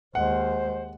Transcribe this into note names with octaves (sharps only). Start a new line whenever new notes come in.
D#2 G#3 C5 F#5